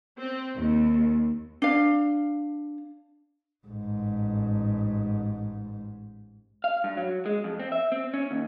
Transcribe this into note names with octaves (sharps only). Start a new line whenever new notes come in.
C4
D#2
D4 F5
A1 G#2
F5
G2
F#3
G#3
F2
C4
E5
C4
C#4
D#2